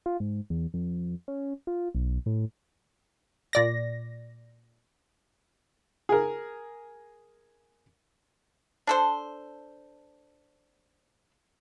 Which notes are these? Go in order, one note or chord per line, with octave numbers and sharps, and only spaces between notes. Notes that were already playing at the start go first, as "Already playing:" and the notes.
F4
G#2
E2
F2
C#4
F4
B1
A2
A#2 D5 A#6
G#4 A#4
D4 A4 C5